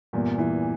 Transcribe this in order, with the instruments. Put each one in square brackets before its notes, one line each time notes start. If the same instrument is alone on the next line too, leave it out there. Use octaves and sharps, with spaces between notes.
[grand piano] E2 [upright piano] G2 A#2
[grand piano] E3